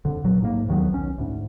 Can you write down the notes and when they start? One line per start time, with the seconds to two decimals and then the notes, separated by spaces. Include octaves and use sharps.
0.05 F2 D3
0.24 D1 A#1 F#3
0.42 G#2 A#3
0.68 D#2 D#3 F#3 B3
0.91 B1 C#4
1.18 D2 G#2